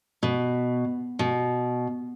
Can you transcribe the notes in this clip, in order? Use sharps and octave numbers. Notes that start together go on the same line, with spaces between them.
B2
B2